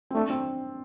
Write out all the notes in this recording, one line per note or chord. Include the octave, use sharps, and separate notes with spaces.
C4
A3 D4
C4